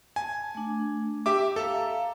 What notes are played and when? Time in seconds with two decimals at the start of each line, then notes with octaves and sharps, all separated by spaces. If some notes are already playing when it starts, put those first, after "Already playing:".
0.16 G#5 A5
0.55 A3 D4
1.26 G4 E5 D6
1.56 A4 E5 F5 A#5